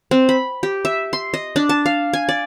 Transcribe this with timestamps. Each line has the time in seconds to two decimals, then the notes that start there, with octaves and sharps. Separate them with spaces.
0.11 C4
0.29 B5
0.63 G4
0.85 E5
1.13 C6
1.34 D#5
1.56 D4
1.69 A5
1.86 F5
2.13 G#5
2.29 D5